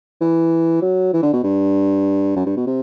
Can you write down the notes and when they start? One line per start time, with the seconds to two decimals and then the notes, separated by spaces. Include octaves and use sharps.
0.21 E3
0.82 F#3
1.13 E3
1.23 D3
1.33 B2
1.44 G2
2.36 F#2
2.46 G2
2.57 B2
2.67 C3